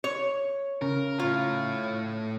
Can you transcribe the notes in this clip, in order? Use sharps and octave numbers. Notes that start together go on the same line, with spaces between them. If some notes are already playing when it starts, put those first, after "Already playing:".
C#5
C#3 A#4
A2 F4 C#5